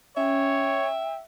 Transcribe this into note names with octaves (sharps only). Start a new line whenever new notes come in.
C#4 C#5 E5 G5